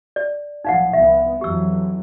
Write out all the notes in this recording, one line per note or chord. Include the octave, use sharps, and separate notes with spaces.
D5
B1 A2 F3 D#4 F5 F#5
C2 F3 B3 E5
F2 E3 F#3 G4 E6